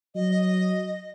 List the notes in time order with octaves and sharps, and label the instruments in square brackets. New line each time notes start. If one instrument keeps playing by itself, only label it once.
[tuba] F#3 [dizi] D#5